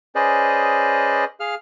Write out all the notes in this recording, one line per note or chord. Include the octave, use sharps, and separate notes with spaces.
C#4 G#4 B4 C5 D5 D#5
G#4 F5 F6